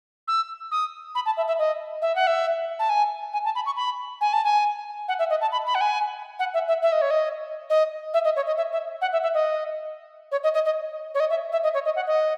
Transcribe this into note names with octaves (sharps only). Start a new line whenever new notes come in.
E6
D#6
B5
A5
E5
E5
D#5
E5
F#5
E5
A5
G#5
G#5
A5
B5
C#6
B5
G#5
A5
G#5
F#5
E5
D#5
A5
B5
B5
F#5
G#5
F#5
E5
E5
E5
D#5
C#5
D#5
D#5
E5
D#5
C#5
D#5
E5
E5
F#5
E5
E5
D#5
C#5
D#5
D#5
D#5
C#5
D#5
E5
E5
D#5
C#5
D#5
F#5
D#5